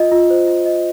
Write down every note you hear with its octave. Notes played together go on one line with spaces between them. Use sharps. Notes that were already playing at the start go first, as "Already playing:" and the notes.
Already playing: F4 D#5
F4
C5
F4
D#5